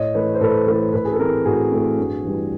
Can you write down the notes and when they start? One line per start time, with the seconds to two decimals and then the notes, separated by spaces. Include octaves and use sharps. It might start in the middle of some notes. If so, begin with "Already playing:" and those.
Already playing: A2 C#5 D#5
0.14 E3 A3 B4 C#5
0.35 C5
0.41 A2 A4 B4
0.67 E3 A3 A4 B4
0.93 A2 A4 B4
1.05 G#4
1.12 A4
1.19 E3 A3 C4 G#4 A#4
1.45 A2 F#4 G#4
1.71 E3 A3 C4
1.97 G2
2.24 E3 G3